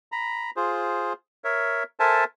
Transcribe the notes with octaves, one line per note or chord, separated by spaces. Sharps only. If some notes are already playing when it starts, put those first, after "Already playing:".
A#5 B5
F4 G#4 C5
A#4 C#5 E5
A4 A#4 C5 E5 G#5 A5